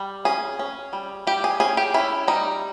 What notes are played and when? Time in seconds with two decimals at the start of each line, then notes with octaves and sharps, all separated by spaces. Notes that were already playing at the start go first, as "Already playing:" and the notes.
Already playing: G3
0.25 C#4 G#4
0.59 C#4
0.93 G3
1.27 G3 G4
1.44 G#4
1.60 C#4 G#4
1.77 G4
1.94 C#4 E4
2.28 G3 D#4